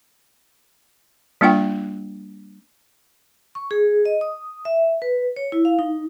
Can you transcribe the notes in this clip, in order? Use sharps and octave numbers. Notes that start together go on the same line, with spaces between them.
G3 A#3 D4 F4 F#5 G5
C#6
G#4
D#5
D#6
E5
B4
C#5
E4
F5
D#4